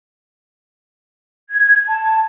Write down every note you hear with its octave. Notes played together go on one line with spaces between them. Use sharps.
G#6
A5